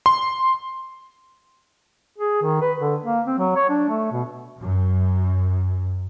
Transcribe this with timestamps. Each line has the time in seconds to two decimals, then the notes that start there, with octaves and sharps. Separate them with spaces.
0.06 C6
2.18 G#4
2.42 D#3
2.62 B4
2.80 D3
3.05 A#3
3.26 C4
3.38 F#3
3.56 C#5
3.69 D4
3.89 A3
4.12 B2
4.62 F#2